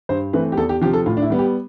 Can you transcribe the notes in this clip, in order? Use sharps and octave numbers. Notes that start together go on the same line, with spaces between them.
G2 C5
E3 A3 C4 B4
G4
E2 A4
G4
C3 F3 G4
A4
A2 F4
D4
E4
G3 B3
G4